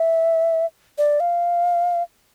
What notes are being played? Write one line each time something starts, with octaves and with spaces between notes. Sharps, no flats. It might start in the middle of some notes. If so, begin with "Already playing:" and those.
Already playing: E5
D5
F5